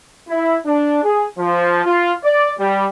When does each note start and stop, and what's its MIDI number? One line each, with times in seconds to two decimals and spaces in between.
0.29 0.56 64
0.66 1.03 62
1.04 1.25 68
1.38 1.81 53
1.84 2.12 65
2.24 2.50 74
2.58 2.86 55